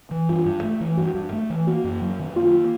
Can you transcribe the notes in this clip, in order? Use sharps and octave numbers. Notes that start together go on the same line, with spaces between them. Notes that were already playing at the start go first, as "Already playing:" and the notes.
E3
G2 F4
G2
A3
E3
G2 F#4
G2
A3
E3
A#3 F#4
F#2
F#3
D#3
A#3 F4